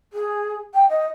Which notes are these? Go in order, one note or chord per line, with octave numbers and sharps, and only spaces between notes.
G#4
G5
D#5